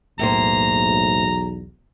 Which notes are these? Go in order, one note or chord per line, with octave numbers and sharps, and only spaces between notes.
B1 E2 A2 A#3 C5 A#5